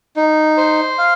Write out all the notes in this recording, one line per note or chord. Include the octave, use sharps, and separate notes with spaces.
D#4
C5
F5